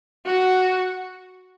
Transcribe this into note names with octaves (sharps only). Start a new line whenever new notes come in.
F#4